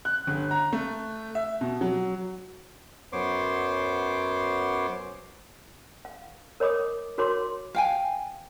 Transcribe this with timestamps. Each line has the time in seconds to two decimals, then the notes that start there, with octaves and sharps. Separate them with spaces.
0.05 F#6
0.27 G1
0.51 A#5
0.73 A3
1.35 E5
1.61 B2
1.81 F#3
3.13 F#2 B3 C5 C#5 C6 D6
6.05 F5
6.60 A#4 C#5 D#5 B5 D6 D#6
7.18 F#4 A#4 C#5 B5 C6 D6
7.75 F5 G5 G#5